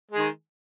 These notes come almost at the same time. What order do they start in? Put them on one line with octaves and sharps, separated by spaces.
G#3 G#4 D#3